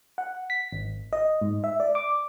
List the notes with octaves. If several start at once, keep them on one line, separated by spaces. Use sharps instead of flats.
F#5
B6
G#1
D#5
G#2
E5
D5
D6